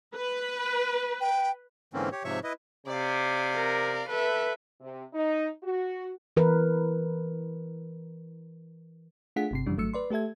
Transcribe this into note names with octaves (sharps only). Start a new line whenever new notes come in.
B4
G5
G#2 D3 E3 A#3 C4 C#4
G4 C#5
G#2 C3 F3 C#5 E5 C#6
E4 B4 D#5
C3 D5 F5
A#4
A4 B4 E5
C3
D#4
F#4
E3 A#4 B4
A3 D4 F4 G#4 F#5 B6
G1 C3 C7
F#2 C#3 E3 F3 G3 D4
G#1 F#3 A3 E6 C#7
B4 D5 C6
A3 G4 A4 E5 G#6